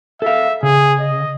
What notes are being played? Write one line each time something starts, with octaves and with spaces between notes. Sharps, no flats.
A4 E5 F5
C#3 G#4
D#5